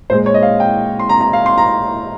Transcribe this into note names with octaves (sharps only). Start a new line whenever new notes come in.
A#2 G#3 C5
C#5
D#5
F5
G5
C6
A#5
A#5
F5
C6
A#5